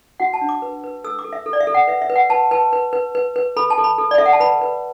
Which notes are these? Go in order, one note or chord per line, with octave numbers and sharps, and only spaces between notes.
F#4 F#5
A5
D4
D6
B4
B4
A4 E6
D6
A4
E5
A4
D5
E5
A4
F#5
B4 E5
E5
B4
F#5
B4 A5
B4 A5
B4
B4
B4
B4
A4 B5
A5
A4
B5
A4
D5
A4 E5
F#5
A5
B4 B5
B4